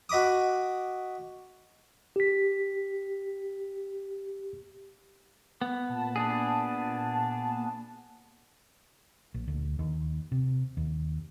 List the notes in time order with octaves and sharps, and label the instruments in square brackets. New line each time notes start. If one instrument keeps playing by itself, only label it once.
[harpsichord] F#4 D#5 B5 D6 D#6
[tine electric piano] G4 B6
[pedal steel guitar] B3
[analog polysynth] A#2 A5
[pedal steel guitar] B3 D4 G#4
[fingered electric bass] A#1
D2
D#2
C3
D#2